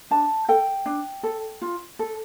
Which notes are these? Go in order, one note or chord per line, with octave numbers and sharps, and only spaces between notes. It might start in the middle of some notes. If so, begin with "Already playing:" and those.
D4 A5
A4 G5
D4
A4
F4
A4